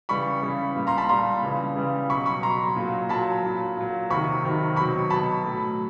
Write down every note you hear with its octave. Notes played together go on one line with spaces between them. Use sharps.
C#3 E3 G3 B5 C#6
C#3 E3 G3
A#2 G3
A#5 C6
A5 B5
A#2 G3 A#5 C6
C#3 E3 G3
C#3 E3 G3
B2 F#3 B5 C#6
B5 C#6
B2 F#3 A#5 C6
A#2 F#3
A#2 F#3 A5 B5
A#2 F#3
A#2 F#3
C3 D#3 F#3 B5 C#6
C3 D#3 F#3
B2 F#3 B5 C#6
B2 F#3 A5 B5
A2 F#3